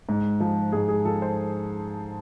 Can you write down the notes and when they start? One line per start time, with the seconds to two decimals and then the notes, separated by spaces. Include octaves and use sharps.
0.09 G#2
0.40 F3
0.72 G#2 G#4
0.88 G#4
1.05 F3 A4
1.22 C5